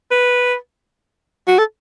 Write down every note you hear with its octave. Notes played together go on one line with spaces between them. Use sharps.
B4
F#4
A4